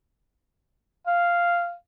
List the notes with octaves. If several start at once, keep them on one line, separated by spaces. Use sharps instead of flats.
F5